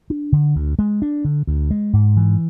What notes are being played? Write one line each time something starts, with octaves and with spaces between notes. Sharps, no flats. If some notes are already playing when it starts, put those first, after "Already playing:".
D4
D3
D2
G#3
D4
D3
D2
G#3
G#2
E3